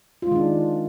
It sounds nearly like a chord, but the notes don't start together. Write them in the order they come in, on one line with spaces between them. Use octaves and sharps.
F4 G#3 D#3 D4